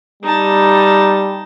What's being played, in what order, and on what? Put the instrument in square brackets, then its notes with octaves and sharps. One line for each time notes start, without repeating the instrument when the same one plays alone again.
[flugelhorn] G3 [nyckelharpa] D#4 A5